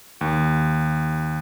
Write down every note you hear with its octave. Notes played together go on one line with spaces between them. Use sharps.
D#2